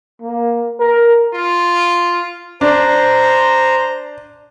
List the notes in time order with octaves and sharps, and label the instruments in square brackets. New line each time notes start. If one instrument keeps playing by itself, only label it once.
[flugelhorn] A#3
A#4
[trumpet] F4
[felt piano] D4 [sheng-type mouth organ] C5 A#5